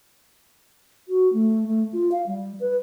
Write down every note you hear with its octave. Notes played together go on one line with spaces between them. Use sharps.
F#4
A3
A3
F4
F5
G3
B4